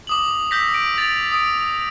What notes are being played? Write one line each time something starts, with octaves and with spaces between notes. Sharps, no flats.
D6 D#6 F#7
D#6 E6 G6 A#6 B6
D7
A6 D7 F7
D#6 D7